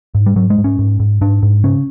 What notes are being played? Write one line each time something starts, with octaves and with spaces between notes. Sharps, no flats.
G#2
G3
G#2 F#3
G#3
G#2
C#4
G#2
G#2
G#2 D4
G#2
C#3 C#4